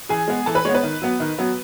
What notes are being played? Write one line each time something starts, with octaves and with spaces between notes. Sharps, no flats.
E3 G#4 G#5
G#3 B3
E3 A4 A5
B4 B5
G#3 B3 C#5
B4
D#3
F#3 B3
D#3
F#3 B3